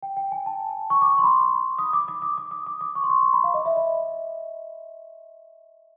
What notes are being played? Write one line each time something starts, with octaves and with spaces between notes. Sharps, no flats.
G5
G5
G#5
A5
C#6
D6
C6
B5
D#6
D6
D6
D#6
D6
D#6
D6
D6
C#6
C6
C#6
C6
B5
F5
D#5
E5
D#5